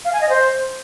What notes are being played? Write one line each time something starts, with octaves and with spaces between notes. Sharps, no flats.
F5
G#5
D#5
C5